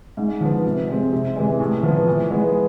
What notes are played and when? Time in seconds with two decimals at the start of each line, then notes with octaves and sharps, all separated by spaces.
0.17 G#2
0.41 F3 B3
0.65 C3
0.89 G#3 C4
1.12 C3
1.36 E3 G#3
1.60 A2
1.83 F3 B3
2.07 E3
2.30 G#3 B3